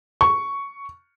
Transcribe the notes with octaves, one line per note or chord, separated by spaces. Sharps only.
C#6